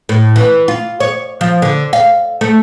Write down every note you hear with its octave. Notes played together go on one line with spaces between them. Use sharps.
A2
E3
F4
C#5
F3
D3
F5
A3